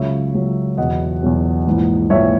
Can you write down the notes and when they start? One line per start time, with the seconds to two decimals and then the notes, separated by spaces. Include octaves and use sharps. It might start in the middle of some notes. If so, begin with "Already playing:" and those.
Already playing: C#2 C#3 F#3 C#5 E5
0.34 C#2 C#3 F#3
0.78 E2 B2 F#3 D#5 F#5
1.23 E2 B2 F#3
1.67 A#1 G#2 E3
2.10 A#1 G#2 E3 C#5 E5